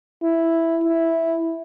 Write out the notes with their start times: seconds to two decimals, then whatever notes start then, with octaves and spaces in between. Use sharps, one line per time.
0.23 E4
0.84 E4